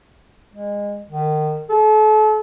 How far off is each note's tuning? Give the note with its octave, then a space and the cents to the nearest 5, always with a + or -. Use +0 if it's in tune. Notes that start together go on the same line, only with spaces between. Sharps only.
G#3 -25
D#3 -30
A4 -35